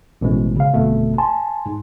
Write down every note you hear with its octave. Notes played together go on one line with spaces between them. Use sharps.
A1 B2 G#3
C#3 F5
G1 F2 B2 A3
G#5 A5 C6
G#2